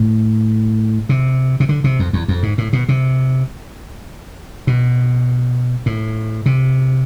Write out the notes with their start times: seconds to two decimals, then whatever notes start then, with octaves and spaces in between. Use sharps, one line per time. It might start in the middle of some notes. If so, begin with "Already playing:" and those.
Already playing: A2
1.09 C3
1.60 C3
1.69 D3
1.84 C3
1.99 F2
2.13 E2
2.28 F2
2.43 G#2
2.58 A2
2.73 B2
2.89 C3
4.67 B2
5.86 A2
6.46 C3